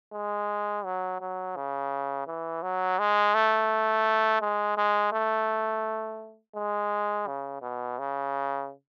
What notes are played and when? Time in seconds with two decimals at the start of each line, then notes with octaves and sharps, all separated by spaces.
0.13 G#3
0.85 F#3
1.21 F#3
1.56 C#3
2.27 E3
2.62 F#3
2.99 G#3
3.34 A3
4.41 G#3
4.77 G#3
5.12 A3
6.56 G#3
7.27 C#3
7.62 B2
7.99 C#3